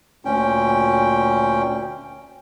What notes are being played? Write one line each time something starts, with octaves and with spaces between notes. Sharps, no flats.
D2 A#2 C#4 G5